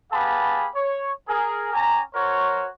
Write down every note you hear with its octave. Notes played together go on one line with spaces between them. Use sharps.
B3 G4 G#4 F5 A5 B5
C#5
G#4 A#4
C#4 G4 G#5 A#5
F#4 A#4 C5 C#5